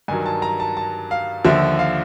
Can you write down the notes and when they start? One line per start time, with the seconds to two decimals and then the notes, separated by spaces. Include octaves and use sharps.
0.08 G2 D#3 F#3 G#5
0.26 A5
0.42 A#5
0.60 A5
0.77 A5
1.11 F5
1.45 D#2 D3 F3 E5
1.79 F5